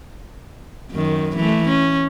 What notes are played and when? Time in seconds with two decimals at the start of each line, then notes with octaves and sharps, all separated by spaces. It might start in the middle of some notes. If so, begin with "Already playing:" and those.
0.91 F#2 D#3
1.37 E3 A3
1.69 C#4